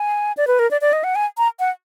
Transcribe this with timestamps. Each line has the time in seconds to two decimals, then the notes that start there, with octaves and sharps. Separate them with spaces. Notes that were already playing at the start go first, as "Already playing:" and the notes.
Already playing: G#5
0.37 D5
0.47 B4
0.59 A#4
0.71 D5
0.81 D5
0.93 D#5
1.04 F#5
1.15 G#5
1.38 A#5
1.60 F#5